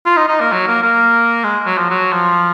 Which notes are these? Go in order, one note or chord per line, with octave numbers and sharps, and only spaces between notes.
F4
D#4
D#4
A#3
F#3
A#3
A#3
G#3
F#3
F3
F#3
F3